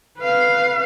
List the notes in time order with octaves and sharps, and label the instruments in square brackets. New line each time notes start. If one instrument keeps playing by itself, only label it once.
[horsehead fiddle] B4 F5